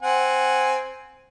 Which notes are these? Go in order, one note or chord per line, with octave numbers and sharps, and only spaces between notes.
C4 F#5 G#5